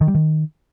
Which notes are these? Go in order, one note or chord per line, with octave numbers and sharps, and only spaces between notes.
D#3
G3
D#3